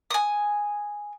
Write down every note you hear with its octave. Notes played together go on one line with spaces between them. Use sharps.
G#5 D#6